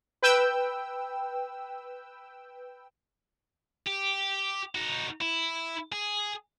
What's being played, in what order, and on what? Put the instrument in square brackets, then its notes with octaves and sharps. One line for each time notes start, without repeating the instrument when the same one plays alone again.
[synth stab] B4 G5 E6
[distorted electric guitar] G4
D#4 F#4
E4
G#4